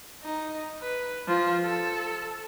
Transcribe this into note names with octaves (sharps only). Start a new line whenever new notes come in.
D#4
B4
F3
A4